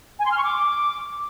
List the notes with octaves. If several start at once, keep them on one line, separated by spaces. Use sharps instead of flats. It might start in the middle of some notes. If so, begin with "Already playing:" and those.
G#5
C6
F6
C#6
D6